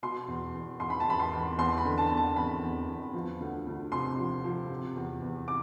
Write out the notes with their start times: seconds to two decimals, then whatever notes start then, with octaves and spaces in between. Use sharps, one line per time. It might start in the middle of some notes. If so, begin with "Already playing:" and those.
0.02 B2 C6
0.28 E2
0.55 E2
0.80 E2 C6
0.90 B5
1.00 A5
1.06 E2 B5
1.19 C6
1.32 E2
1.58 E2 C6
1.78 B5
1.85 D3
1.98 A5
2.10 E2
2.17 A5
2.36 E2 B5
2.63 E2
2.89 E2
3.13 F3
3.40 D2
3.67 D2
3.92 C3 C6
4.18 F3
4.44 F3
4.69 C3
4.96 E2
5.22 E2
5.48 D6